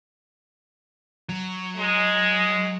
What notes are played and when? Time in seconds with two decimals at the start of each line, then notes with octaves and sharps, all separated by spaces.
1.29 F#3
1.77 G#3